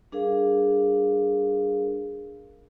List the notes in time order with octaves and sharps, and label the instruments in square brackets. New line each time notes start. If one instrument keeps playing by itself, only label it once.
[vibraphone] G3 D4 G#4 A#4 F5